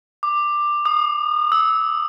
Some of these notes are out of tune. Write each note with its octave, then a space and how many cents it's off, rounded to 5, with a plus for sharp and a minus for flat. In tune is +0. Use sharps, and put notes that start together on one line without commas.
D6 +15
D#6 -30
E6 -20